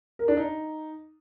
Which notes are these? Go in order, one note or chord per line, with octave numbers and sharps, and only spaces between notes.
A#4
D4
D#4